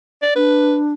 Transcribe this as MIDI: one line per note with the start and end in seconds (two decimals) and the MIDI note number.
0.22 0.35 74
0.36 0.94 62
0.36 0.78 71